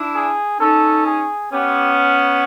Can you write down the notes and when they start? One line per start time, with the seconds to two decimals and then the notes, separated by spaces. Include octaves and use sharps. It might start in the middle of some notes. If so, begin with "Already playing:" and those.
Already playing: D4 E4
0.15 G#4
0.59 C#4 D#4 A4
1.06 G#4
1.52 B3 C#4 G4